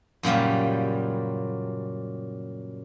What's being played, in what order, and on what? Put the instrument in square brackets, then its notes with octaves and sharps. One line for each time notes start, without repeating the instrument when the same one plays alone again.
[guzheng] F#2 A#2 C#3 F#3 G3